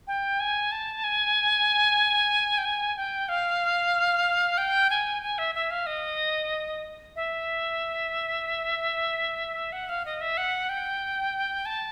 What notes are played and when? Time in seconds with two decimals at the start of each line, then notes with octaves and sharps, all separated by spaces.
0.07 G5
0.40 G#5
0.72 A5
1.04 G#5
2.58 G5
2.65 G#5
2.97 G5
3.29 F5
4.58 G5
4.90 G#5
5.23 G#5
5.38 E5
5.55 E5
5.71 F5
5.86 D#5
7.16 E5
9.72 F#5
9.89 F5
10.05 D#5
10.21 E5
10.37 F#5
10.69 G5
11.66 A5